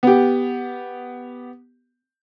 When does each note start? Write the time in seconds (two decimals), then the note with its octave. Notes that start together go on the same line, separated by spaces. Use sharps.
0.03 B3 G4